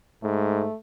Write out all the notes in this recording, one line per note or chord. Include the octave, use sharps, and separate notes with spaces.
G#2 A3